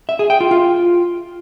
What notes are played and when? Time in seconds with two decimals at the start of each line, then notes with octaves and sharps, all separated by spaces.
0.09 E5
0.19 G#4
0.30 G5
0.40 F4
0.51 F4